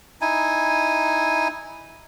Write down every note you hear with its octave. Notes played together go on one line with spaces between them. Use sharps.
D#4 E4 G#5